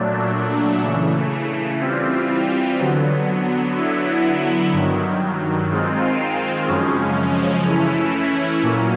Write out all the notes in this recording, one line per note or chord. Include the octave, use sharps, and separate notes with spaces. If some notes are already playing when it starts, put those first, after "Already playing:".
Already playing: A#2 F#3 A3 D4
C#3 E3 A3
E3 G3 C4 F4
D3 F#3 B3
D3 F#3 B3 E4
G2 D#3 F#3
D#3 G#3 C4 F4
F#2 C#3 F3 G#3 C#4
E3 A3 C#4 E4
A#2 F#3 A#3 C#4